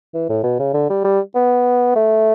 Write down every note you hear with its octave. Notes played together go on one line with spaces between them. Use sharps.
E3
A2
B2
C#3
D3
G3
G3
B3
A3